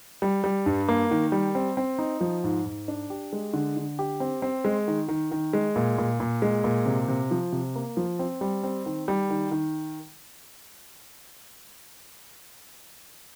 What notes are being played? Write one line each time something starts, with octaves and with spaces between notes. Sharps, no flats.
G3
G3
G2
A#3
D#3
G3
C4
C4
D#4
F3
G#2
G#2
D4
G4
G#3
D3
D3
G4
C4
C4
G#3
D#3
D#3
D#3
G#3
A#2
A#2
A#2
G#3
A#2
C3
C3
F3
C3
A#3
F3
C4
G3
C4
D#3
G3
D#3
D#3